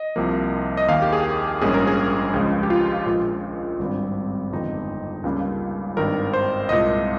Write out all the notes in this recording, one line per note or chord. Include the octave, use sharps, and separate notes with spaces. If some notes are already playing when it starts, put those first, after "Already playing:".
Already playing: D#5
C2 C3 F3 A#3
D#5
D#2 D#3 A#3 F5
G4
G#4
A#1 G#2 G3 A#3 C#4 G#4
A#4
G#4
C#2 C#3 F3 G#3
G4
F4
A#1 A#2 G#3
G#1 G2 G3 C4
G1 F2 D#3 G#3 D#4
C#2 C#3 G3 A#3
G#1 G2 D#3 A#4
C5
C2 A#2 G#3 D#5